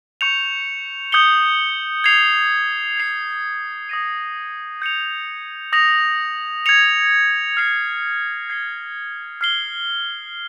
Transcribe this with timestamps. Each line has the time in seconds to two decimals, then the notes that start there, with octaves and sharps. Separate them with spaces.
0.21 C#6 G6 C#7 F7
1.12 D#6 G6 C#7 G7
2.04 G#6 C7 F7
2.97 G#6 C7 F7
3.89 D#6 A#6 D#7
4.82 G6 C#7 F7
5.73 D#6 A#6 F7
6.66 G#6 C#7 F7
7.57 F6 C7 F7
8.50 G#6 C7 G7
9.41 F6 C7 G7